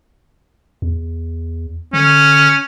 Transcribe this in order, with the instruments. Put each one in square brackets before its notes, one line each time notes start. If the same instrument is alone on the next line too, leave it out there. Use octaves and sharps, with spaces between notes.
[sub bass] E2
[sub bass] D3 [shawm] C#4